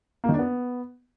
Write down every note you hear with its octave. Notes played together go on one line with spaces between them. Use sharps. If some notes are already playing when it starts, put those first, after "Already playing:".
A#3
D#3
D4
B3